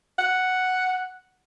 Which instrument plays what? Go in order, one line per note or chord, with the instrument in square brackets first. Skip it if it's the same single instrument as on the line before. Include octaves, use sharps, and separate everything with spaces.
[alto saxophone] F#5